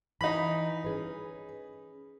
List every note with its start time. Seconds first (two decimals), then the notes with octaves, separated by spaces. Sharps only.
0.21 E3 D#4 B5
0.84 C#4 G#4 B4